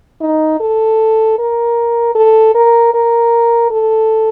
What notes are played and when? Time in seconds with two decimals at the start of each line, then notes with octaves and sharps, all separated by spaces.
0.21 D#4
0.60 A4
1.39 A#4
2.15 A4
2.55 A#4
2.94 A#4
3.71 A4